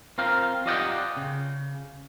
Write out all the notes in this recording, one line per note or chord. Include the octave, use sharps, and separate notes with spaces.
C4 F4 A#4 F5 G5
F4 G4 D5 D#5 F#5 G5
C#3